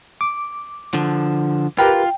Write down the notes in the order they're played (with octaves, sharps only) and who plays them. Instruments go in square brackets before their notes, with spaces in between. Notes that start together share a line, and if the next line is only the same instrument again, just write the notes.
[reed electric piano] D6
[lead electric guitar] D3 F3
[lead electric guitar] F4 [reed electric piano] G4 A#4 B4 [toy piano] G5